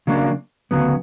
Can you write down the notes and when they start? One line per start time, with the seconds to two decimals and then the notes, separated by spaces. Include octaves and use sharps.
0.07 C#3 F#3 A#3 D4
0.71 D2 C#3 F#3 B3